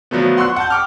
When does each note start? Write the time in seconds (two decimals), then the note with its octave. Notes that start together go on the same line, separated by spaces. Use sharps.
0.11 D3 F3 F#3 A3 B3
0.37 F#5 C6 C#6 E6 F#6
0.56 F#5 A5 G6
0.70 G5 D6 F6